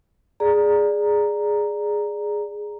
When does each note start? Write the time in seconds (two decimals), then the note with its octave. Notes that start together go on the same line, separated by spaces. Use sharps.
0.40 G#4 D5 A#5